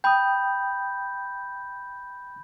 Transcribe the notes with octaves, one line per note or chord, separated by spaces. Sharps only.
G5 B5 D#6 G6